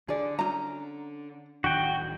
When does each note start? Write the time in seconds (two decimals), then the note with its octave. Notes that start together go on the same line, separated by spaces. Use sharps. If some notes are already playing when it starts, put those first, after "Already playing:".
0.08 D3 G#4 D5
0.39 C#4 D#4 A#5
1.64 D1 D#3 D4 F#4 G5